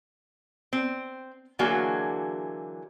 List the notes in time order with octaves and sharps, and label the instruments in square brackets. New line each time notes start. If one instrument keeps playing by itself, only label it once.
[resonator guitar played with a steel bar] C4
D3 E3 F#3 A#3 F#4 G#4